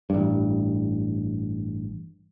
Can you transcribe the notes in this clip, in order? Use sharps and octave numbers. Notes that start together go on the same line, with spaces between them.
A1 G2